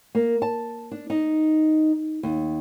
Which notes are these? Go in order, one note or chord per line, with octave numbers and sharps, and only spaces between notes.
A#3
A5
D4
D#4
D#2